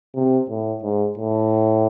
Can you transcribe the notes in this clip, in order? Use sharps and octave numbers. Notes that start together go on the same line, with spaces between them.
C3
A2
G#2
A2